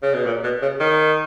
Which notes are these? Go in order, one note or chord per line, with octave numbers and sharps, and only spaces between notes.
C#3
B2
A#2
B2
C#3
D#3